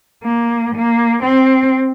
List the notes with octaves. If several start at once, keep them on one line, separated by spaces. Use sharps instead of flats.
A#3
A#3
C4